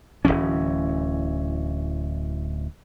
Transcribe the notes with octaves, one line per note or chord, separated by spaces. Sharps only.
D1 C2 E3 C#4